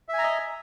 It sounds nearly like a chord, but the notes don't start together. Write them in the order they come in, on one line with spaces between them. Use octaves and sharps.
E5 G#5 A#5 D#5